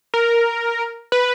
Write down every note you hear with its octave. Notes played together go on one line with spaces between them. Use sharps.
A#4
B4